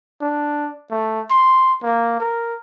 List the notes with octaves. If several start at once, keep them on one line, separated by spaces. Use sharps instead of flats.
D4
A3
C6
A#3
A#4